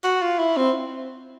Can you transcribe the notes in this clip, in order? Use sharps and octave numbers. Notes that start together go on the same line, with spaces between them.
F#4
F4
E4
C4